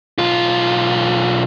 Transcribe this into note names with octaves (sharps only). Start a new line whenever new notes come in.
B1 F4